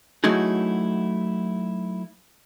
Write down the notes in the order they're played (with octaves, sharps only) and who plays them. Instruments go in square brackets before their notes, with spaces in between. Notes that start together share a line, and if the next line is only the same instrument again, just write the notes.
[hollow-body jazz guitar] F#3 A3 D#4 E4 F#4 G#4